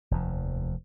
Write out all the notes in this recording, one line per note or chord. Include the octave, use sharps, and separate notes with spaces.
F1 D#2 F3